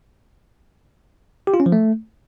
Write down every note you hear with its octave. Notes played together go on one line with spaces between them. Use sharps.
G4
F4
C#4
F3
A3